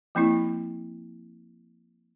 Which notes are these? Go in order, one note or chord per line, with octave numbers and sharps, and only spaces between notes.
F3 A#3 C4 E4